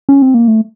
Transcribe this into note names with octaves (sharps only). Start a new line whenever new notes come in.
C#4
C4
A#3
A3